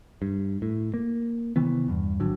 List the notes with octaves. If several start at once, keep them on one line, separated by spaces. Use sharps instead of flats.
G2
A2
A#3
C3 D#3 E3 B3
E2 G2
G#1 D3 F#3